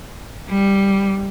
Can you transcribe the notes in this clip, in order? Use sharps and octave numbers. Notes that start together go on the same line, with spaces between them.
G3